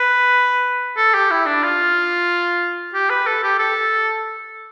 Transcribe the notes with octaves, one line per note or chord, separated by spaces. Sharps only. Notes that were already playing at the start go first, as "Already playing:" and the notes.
Already playing: B4
A4
G4
E4
D4
F4
G4
B4
A4
G4
A4